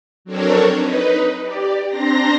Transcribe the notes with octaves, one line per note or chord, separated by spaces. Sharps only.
F#3 C4 D4 A4 A#4 C#5
D#4 B4
G4 D5
C4 D4 A#5 C6 A#6